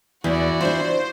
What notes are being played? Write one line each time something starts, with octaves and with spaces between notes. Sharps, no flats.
E2 E3 F#4 D5
D4 F4 C5